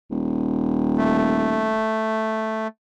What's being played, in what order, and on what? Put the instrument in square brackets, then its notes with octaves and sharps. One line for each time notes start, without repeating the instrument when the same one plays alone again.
[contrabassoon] D#1
[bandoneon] A3